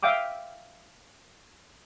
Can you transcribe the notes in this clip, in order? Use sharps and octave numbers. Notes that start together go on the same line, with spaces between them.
E5 F5 G5 D6 D#6